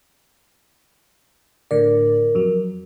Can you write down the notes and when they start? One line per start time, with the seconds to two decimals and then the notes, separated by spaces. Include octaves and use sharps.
1.71 A2 D3 A#4 D5
2.35 F2 F#3